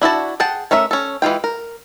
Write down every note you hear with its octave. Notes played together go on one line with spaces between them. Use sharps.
D4 E4 F#4 A5
G#4 F#5 G5 A5
A3 C#4 A#4 E5
C#4 A4
E3 G#3 F4 G5
A#4